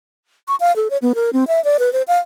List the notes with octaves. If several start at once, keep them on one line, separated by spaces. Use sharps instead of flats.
C#6
F5
A4
C#5
B3
A#4
C4
E5
D5
B4
C5
F5